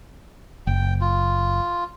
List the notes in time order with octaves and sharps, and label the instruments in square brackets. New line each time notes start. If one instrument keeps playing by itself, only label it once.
[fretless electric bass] F#1 [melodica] G5
[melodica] F4